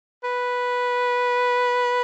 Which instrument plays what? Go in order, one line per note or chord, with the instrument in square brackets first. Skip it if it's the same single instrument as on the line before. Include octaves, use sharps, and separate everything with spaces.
[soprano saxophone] B4